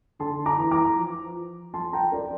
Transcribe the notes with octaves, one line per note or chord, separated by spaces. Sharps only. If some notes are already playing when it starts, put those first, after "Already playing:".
D3 A5 C6
A#5 D6
E3
A#5 D6
F3
F3 A5 C6
G5 A#5
A#4 D5